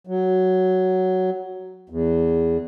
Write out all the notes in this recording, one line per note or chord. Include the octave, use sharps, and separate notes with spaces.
F#3
E2